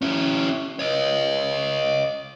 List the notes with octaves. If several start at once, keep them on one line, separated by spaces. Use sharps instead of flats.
C#4 E4
C#5 D#5